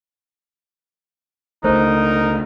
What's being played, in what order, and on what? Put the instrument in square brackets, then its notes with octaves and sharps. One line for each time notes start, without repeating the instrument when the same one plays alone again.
[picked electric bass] C#2 A3 [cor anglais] D#4 [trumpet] A#4 [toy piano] C5